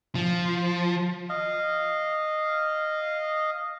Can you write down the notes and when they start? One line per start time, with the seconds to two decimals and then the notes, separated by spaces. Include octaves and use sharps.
0.15 F3
1.29 D#5 F5